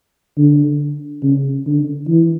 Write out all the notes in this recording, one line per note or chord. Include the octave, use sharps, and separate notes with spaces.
D3
C#3
D3
E3